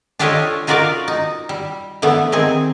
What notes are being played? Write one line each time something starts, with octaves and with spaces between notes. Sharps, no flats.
D4 F4 G4 A4 C#5 D#5
D#4 F4 F#4 A#4 D5 F5
D#4
G3
D3 E3 A3 B3
D#3 C4 G#4